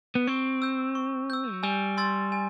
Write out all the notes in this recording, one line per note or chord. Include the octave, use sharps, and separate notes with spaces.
B3
C4 C#6
E6 G6
C#6
E6 G6
F#3
G3 G#5
C6 E6 A6
G#5